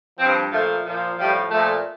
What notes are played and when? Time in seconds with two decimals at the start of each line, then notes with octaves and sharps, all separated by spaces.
0.19 G2 F3 C4
0.52 A#2 F3 A3
0.85 A#2 F3
1.18 A2 F3 G3
1.50 A#2 F3 A3